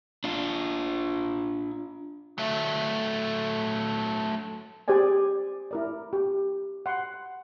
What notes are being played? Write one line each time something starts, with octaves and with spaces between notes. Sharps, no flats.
D4 F4
F#3 A3
G4 G#4 C5 D5 G#5
E4 A#4 D5
G4
F#5 C6